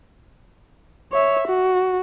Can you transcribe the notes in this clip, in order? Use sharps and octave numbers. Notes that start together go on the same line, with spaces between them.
C#5 E5
F#4